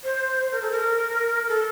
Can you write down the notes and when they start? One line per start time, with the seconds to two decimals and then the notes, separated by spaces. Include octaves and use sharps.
0.04 C5
0.52 A#4
0.62 A4
0.72 A#4
1.48 A4